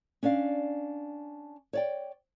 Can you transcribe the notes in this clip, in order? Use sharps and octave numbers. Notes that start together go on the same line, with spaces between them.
C#4 D4 D5 F5
C#5 D5 G5